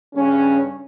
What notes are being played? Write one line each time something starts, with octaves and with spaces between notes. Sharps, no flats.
G2 C#3 C#4